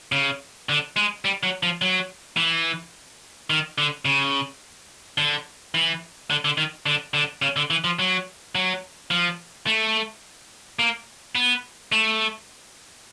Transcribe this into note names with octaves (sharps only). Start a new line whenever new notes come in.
C#3
D3
G#3
G3
F#3
F3
F#3
E3
D#3
D3
C#3
D3
E3
D3
D3
D#3
D3
D3
C#3
D3
E3
F3
F#3
F#3
F3
A3
A#3
B3
A3